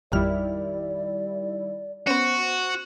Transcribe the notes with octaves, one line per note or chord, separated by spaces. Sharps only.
A1 F2 D#3 G3 E4 D5 F6
B3 C#4 F#4 C5